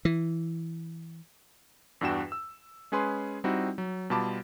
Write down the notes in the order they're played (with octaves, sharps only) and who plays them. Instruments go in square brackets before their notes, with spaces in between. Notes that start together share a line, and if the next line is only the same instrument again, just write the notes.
[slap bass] E3
[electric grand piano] E2 G2 D4 F#4 G5 E7
E6
G#3 C#4 G#4 B4 C6
G3 C4 D#4 E4 F#4
F#3
B2 G3 F4 A5 B5 D6